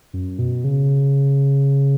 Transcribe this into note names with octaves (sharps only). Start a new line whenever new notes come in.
F#2
B2
C#3